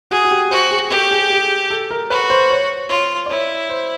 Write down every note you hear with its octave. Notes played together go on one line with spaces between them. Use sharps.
F#4 G#4
F#4
G4
F#4 C5
G#4
G4 A4
G#4
G#4
A4
A#4
F#4 B4
C5
C#5
F4 C#5
D5
E4 C#5
C5